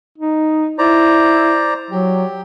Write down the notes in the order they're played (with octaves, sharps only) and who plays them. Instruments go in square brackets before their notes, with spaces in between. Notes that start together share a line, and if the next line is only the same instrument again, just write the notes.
[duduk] D#4
[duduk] E4 [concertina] C5 D5 A#5
[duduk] F#3 [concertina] G4